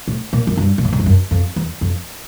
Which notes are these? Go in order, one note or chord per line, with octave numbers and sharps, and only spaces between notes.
A2
A#2
F#2
G2
A#2
A2
G#2
G2
F#2
F2
E2
F2